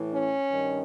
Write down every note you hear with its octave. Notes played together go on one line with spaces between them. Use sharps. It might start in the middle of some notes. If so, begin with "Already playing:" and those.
Already playing: A2 E3
C#4
G2 D#3